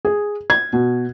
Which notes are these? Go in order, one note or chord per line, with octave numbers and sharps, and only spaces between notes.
G#4
G#6
B2